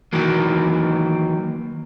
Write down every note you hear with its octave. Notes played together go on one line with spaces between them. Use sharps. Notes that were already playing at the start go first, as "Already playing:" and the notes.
D#3 E3 F#3 A#3